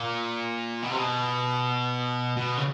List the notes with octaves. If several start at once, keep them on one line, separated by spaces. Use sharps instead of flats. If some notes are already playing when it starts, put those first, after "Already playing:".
Already playing: A#2
B2
C3
B2
B2
C#3